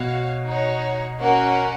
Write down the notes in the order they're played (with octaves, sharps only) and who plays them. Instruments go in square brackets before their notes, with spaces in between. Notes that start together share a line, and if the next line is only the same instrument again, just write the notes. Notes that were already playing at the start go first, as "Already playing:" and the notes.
Already playing: [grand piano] B2 [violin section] F#4 C#5 F5
[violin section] D#4 F#4 C#5
A#3 C#4 F#4 A#4